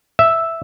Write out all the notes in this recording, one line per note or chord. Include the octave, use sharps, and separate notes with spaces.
E5